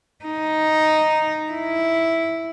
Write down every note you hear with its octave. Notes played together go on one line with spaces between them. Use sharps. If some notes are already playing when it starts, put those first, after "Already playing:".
D#4
E4